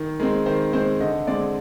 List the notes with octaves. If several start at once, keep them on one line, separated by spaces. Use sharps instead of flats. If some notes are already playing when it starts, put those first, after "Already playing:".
Already playing: D#3
G#3 C4 A#4
D#3 C5
G#3 C4 C5
D3 D#5
G#3 C4 D5